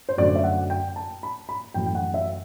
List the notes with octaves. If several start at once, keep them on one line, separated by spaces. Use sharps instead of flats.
C5
F#2 D3 A3 D5
E5
F#5
G5
A5
B5
B5
F#2 E3 A3 G5
G5
F#5
E5